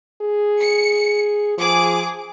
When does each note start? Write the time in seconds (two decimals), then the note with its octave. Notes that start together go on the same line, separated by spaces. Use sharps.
0.22 G#4
0.59 C#7
1.58 F3 G#4 D6